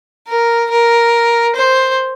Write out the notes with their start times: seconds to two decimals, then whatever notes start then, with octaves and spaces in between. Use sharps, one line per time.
0.27 A#4
0.70 A#4
1.55 C5